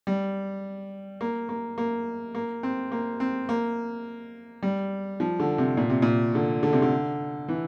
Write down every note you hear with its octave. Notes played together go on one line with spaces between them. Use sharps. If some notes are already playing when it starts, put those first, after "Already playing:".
G3
A#3
A#3
A#3
A#3
C4
A#3
C4
A#3
G3
F3
D3
C3
A#2
C3
A#2
D3
D3
C3
D3
E3